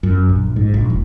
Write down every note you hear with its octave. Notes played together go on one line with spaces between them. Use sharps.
F#2
A#1
G#2
A#1
E1